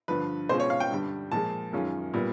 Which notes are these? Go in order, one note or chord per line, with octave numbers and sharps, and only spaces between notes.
G2 D3 F3 B4
B2 G#3 C#4 F4 C5
C#5
F5
G5
G2 D3 G3
A#2 F3 G#3 A5
F#2 D#3 G#3 C#4 F4
A#2 G3 B3